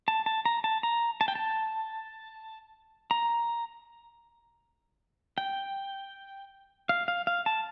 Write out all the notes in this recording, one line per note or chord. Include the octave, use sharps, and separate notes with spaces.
A5
A5
A#5
A5
A#5
A5
G5
A5
A#5
G5
F5
F5
F5
A5